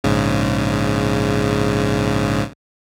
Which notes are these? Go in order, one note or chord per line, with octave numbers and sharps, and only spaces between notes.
A#1 G#2 C#3